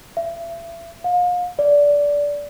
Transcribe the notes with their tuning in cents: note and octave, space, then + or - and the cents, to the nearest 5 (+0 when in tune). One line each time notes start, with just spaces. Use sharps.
E5 +35
F5 +35
D5 -15